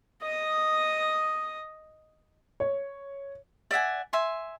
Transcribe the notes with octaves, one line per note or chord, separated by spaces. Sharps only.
D#5 D#6
C#5
D5 E5 F#5 G#5
E5 G#5 C6